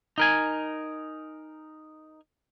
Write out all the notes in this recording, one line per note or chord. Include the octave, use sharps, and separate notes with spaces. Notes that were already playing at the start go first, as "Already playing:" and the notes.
D#4 A#4 G#5